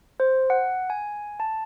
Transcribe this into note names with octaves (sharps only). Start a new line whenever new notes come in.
C5
F#5
G#5
A5